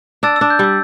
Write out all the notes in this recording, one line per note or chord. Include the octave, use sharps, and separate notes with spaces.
D4 E6 A6
D4 E6
G6
G3 E6